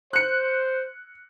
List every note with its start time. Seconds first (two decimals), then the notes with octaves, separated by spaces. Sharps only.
0.13 C5 F#6 C#7